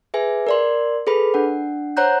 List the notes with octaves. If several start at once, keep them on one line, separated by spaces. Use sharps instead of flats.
G#4 B4 E5 G#5
A#4 D5 C6
G#4 A4 B4 B5
D4 F#5
C5 C#5 F#5 A#5 F#6 G6